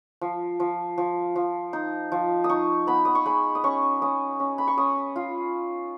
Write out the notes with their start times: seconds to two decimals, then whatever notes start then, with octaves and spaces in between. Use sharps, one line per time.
0.21 F3
0.60 F3
0.98 F3
1.36 F3
1.73 D#4
2.12 F3
2.44 D#6
2.50 D#4 C#6
2.87 B3 B5
3.05 D#6
3.15 C#6
3.26 G#3 B5
3.55 D#6
3.64 C#4 C#6
4.02 C#4 D#6
4.40 C#4
4.58 B5
4.68 C#6
4.77 C#4 D#6
5.16 F4